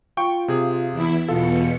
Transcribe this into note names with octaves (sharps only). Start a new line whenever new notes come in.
F4 G5 C#6
C3 G#4
E2 E4
E2 B2 F4 A4 C#7